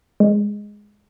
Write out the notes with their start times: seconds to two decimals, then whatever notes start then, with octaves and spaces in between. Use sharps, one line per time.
0.20 G#3